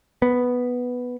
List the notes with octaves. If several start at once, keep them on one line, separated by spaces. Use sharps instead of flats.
B3